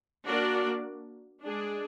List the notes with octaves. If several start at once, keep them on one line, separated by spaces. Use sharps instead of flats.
A#3 D4 F#4 A#4 D5
G#3 D4 G#4 D5